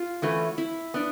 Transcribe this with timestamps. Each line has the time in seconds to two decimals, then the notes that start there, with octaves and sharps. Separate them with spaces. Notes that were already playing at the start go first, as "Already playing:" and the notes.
Already playing: F4
0.22 E3 A3 C#4 F#4 B4
0.58 E4
0.94 B3 D4